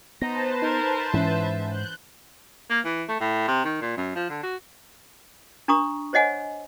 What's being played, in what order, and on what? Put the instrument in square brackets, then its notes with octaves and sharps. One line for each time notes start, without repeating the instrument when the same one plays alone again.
[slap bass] B3 [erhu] D#4 [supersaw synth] B4 C5 A5 [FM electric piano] A#6
[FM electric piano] D#4 [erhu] A#4
[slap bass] G#2 [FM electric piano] E3 C#4 [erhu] E5
[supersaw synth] F#6 G6
[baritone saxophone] A#3
E3
A3
A2
C3
D#3
A#2
F#2
F3
D3
F#4
[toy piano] D4 A#5 C#6 D#6
C5 C#5 D#5 F#5 G#5